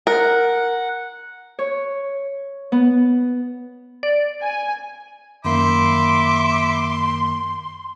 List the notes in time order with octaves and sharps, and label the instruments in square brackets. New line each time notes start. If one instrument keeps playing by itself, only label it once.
[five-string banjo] A#4 [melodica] F#5
[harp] C#5
B3
[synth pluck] D5
[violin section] G#5
[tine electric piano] F#2 D#3 A#3 [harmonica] E5 B5 D6 [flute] C6